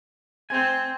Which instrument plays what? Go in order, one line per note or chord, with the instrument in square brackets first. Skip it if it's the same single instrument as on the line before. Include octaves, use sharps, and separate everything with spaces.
[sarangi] C4 [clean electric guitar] C5 G#5